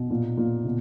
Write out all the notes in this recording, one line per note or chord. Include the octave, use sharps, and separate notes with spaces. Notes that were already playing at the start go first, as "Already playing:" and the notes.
Already playing: B2
A#2
A#2
B2